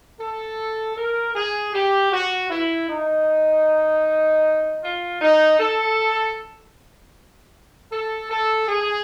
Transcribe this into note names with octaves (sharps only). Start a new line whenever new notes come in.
A4
A#4
G#4
G4
F#4
E4
D#4
F4
D#4
A4
A4
A4
G#4